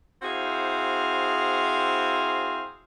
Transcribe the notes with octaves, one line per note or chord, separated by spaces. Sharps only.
C4 E4 F#4 G#4 C5 F5